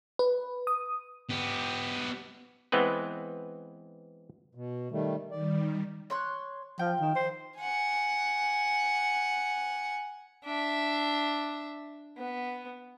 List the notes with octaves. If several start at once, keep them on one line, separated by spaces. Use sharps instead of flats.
B4
D#6
B3 G4
E3 G#3 B3 C4 B4
B2
D#3 G3 A3
D#3 G3 D5
C#5 C6 F#6
F3 G5
D#3
C5
F#5 G#5
D4 E5
B3